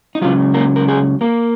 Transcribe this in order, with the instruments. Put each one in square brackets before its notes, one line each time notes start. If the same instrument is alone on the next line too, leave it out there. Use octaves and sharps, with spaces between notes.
[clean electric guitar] D#4
C#2 C#3 F#3 F4
A#3 A#4
A#4
G#3 G#4
A#3 A#4